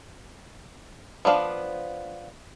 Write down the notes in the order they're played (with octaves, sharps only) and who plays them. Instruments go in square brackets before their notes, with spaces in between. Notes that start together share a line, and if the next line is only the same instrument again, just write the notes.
[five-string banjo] F3 B3 D4 F5